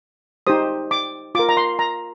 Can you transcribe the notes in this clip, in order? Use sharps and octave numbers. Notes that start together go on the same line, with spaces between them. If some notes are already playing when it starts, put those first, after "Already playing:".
D#4 G4 C5 D#6
D6
F4 A#4 D6
A#5
C6
A#5